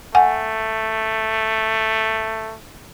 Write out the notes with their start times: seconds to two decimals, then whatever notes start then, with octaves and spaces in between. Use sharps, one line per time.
0.15 A3 F#5 G#5